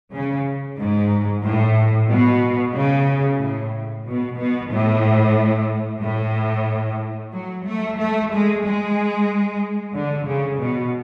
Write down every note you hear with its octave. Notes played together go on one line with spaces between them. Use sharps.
C#3
G#2
A2
B2
C#3
A2
B2
B2
A2
A2
F#3
A3
A3
G#3
G#3
D3
C#3
B2